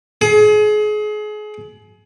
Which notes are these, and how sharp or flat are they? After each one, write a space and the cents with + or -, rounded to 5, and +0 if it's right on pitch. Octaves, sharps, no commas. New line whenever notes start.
G#4 +30